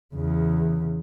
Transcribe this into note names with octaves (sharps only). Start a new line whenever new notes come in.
E2 C#3